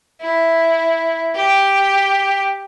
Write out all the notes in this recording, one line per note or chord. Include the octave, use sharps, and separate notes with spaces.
E4
G4